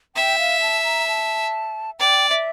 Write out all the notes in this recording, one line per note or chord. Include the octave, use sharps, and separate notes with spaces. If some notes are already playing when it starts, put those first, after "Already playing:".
E5 G5
F5
A5
A#5
A5
D5 G5
E5